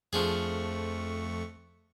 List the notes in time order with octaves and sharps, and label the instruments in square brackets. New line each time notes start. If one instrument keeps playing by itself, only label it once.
[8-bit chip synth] F2 A3 C#6 [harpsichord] F3 D4 G#4